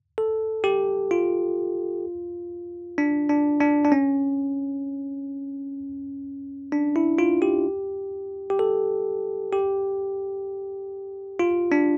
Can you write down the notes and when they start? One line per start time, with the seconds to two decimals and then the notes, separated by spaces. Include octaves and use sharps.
0.18 A4
0.64 G4
1.11 F4
2.98 D4
3.29 D4
3.60 D4
3.85 D4
3.92 C#4
6.72 D4
6.96 E4
7.18 F4
7.42 G4
8.50 G4
8.59 A4
9.53 G4
11.39 F4
11.72 D4